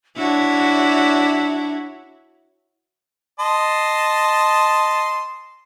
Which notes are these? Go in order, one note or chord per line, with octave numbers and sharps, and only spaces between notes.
D4 E4 F#4 C#5
D#5 A5 C6